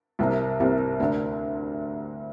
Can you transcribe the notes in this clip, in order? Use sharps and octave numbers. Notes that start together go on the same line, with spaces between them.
C2 C3 G3 A#3
C2 C3 G3 A#3
D2 D3 A#3 D4